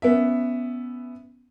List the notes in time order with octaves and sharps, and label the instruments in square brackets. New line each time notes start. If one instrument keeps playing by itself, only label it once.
[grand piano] B3 C#4 E5